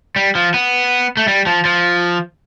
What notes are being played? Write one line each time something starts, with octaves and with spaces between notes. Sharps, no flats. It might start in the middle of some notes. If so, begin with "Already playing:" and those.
G3
F3
B3
A3
G3
F3
F3